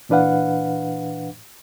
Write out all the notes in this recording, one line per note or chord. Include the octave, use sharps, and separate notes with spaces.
A#2 E3 D4 B4 F5 F#5